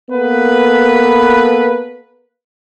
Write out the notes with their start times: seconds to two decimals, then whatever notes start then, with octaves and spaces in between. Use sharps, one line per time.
0.10 A#3 B3 A4 B4